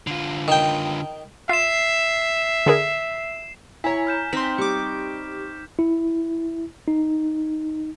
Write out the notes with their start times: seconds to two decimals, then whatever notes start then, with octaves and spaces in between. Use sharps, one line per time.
0.07 D3 F4
0.48 D#3 G5
1.49 F4 E5 C7 E7
2.66 D3 G#4 A#4
3.84 E4 C#5 G#5 A#5 B6
4.07 F6 G6 E7
4.33 C4 D#4 C6 B6
4.58 G3 C#6 D6
5.79 E4
6.88 D#4